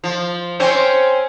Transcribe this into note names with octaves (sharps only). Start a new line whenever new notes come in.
F3
C4 C#4 C5